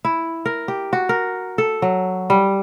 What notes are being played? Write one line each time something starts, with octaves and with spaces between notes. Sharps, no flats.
E4
A#4
G4
F#4
A#4
A4
F#3
G3